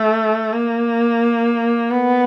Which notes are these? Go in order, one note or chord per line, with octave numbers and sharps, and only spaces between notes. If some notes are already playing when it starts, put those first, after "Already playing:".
Already playing: A3
A#3
B3